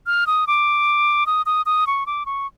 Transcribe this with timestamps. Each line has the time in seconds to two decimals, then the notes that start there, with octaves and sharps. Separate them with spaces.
0.07 F6
0.27 D#6
0.47 D6
1.27 D#6
1.46 D#6
1.66 D#6
1.87 C#6
2.06 D6
2.26 C#6